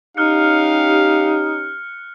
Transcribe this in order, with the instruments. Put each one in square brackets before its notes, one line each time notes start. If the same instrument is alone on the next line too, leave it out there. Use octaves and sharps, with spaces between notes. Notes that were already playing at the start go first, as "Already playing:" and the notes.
[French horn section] C#4 G4 [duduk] D#4 [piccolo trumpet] F5 [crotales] F6 F#6 C#7